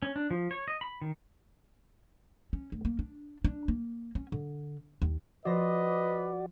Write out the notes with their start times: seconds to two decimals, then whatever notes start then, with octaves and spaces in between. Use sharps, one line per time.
0.02 C#4
0.16 D4
0.31 F3
0.51 C#5
0.68 D#5
0.81 B5
1.02 D#3
2.53 C#4
2.72 D2
2.85 A#3
2.99 D4
3.44 D4
3.68 A#3
4.15 C#4
4.32 D3
5.02 D#2
5.45 F3 F#4 B4 C5 D5 D#5 A#6